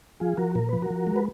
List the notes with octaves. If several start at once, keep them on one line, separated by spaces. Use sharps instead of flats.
F3 F4 G#4
F3 F#4 A#4
A#2 A#4
F3 B4
F#4 A#4
F3
G#3
B4